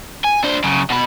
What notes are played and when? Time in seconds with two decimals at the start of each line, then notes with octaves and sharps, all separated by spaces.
0.25 G#5
0.44 D4 C5
0.64 F#2 C#3
0.90 B2 B4